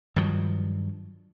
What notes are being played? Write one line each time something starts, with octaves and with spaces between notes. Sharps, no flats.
G2 D#3 F3 F#3